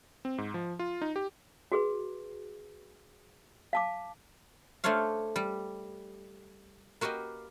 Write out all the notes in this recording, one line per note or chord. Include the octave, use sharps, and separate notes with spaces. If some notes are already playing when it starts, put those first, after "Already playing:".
C4
G#2
F3
F4
D#4
G4
F#4 G#4 B4
F5 A5 D6
A3 D4 C5 C#5 F5
G3
A#3 F#4 G4 B4 D#5